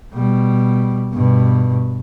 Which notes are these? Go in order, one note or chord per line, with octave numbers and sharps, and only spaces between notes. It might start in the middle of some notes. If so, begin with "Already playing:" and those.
B2 G3
G2 B2